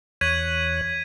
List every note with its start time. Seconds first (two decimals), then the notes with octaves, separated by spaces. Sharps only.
0.21 E2 C#5 F#6 G#6 B6 D#7